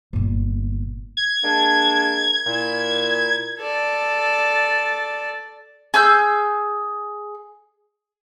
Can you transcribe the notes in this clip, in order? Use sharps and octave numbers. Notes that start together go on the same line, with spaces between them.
G1 A#2
G#6
G#3 A#3 D4
A#2 E4
A4 D5
G#4 E6 G6